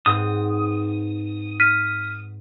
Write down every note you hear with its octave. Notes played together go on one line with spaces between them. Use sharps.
G#2 B3 C4 D#6
F6 B6 D#7